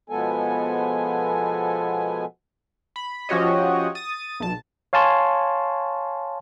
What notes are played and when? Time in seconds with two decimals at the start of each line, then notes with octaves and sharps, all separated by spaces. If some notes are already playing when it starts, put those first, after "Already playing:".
0.10 B2 F3 G#3 B3 A4 G#5
2.96 B5
3.29 F3 C#4 F#4 G4 C#5 D#5
3.95 D#6 A6 D#7
4.40 B1 A5
4.93 C#5 F5 G#5 A5 C6 C#6